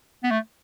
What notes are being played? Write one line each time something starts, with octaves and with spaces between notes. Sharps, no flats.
B3
A3